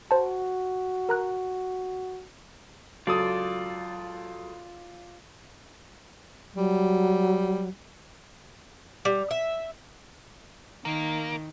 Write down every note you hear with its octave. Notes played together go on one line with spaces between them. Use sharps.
F#4 C5 A5
A#4 A#5 F#6
C#2 F#3 F4 A4 D5 D#6
F#3 G3
G3
E5
D#3 A#3